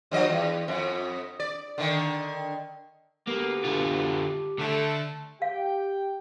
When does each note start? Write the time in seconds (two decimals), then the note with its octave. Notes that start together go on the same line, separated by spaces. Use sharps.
0.11 G2 F3 D#5
0.30 E2
0.68 F2
1.40 D5
1.78 D3 D#3
3.27 D2 A#3 B3 G4
3.65 D3 F4
4.59 D3 A3 A4
5.42 G4 F5 G5